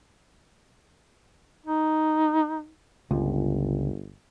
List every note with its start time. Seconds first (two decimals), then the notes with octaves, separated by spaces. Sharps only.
1.66 D#4
3.11 G1 C#2